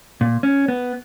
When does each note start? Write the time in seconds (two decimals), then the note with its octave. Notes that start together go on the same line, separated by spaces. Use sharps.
0.21 A#2
0.43 C#4
0.68 B3